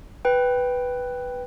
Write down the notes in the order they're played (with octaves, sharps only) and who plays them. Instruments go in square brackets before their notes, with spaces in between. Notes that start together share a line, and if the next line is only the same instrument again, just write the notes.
[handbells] B4 G5